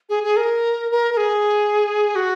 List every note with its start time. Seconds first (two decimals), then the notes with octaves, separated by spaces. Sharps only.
0.09 G#4
0.23 G#4
0.37 A#4
0.91 A#4
1.13 A#4
1.17 G#4
2.15 F#4